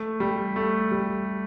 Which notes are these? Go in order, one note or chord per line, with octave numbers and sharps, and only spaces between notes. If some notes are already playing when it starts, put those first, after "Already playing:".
Already playing: A3
G3
A3
G3